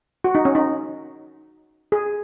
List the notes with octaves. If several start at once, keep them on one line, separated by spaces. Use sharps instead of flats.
F#4
D#4
C#4
D#4
G#4